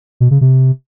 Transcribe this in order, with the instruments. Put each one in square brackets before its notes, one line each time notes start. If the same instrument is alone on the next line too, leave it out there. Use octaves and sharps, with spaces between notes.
[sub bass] B2
C#3
C3